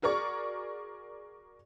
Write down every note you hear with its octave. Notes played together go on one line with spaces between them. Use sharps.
F#4 G#4 A#4 D5 C#6